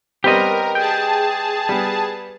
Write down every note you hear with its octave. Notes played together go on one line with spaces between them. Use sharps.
G3 B3 C4 G4 A#4 D#5
G#4 G5 A5
G3 B3